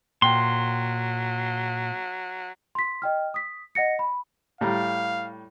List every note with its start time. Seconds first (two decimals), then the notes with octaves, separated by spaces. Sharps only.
0.22 A#2 F#3 G5 C6
2.75 C6 B6
3.02 D#5 G5 F6
3.34 D#6 B6
3.75 D#5 F#5 A#6 C#7
3.99 B5
4.61 A2 G3 F5 A#5